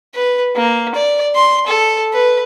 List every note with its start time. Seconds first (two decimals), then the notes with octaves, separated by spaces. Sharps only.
0.15 B4
0.56 A#3
0.95 D5
1.35 C6
1.67 A4
2.13 B4